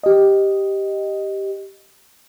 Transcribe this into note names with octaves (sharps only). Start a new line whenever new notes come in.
G4 D#5